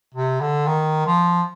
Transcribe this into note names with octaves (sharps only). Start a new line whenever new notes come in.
C3
D3
D#3
F3